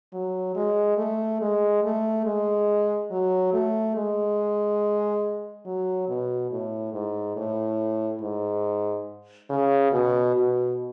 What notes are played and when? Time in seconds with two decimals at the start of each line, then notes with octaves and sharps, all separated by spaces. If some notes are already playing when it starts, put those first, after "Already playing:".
0.13 F#3
0.56 G#3
0.98 A3
1.41 G#3
1.84 A3
2.26 G#3
3.11 F#3
3.53 A3
3.96 G#3
5.66 F#3
6.09 B2
6.51 A2
6.94 G#2
7.37 A2
8.21 G#2
9.50 C#3
9.92 B2
10.35 B2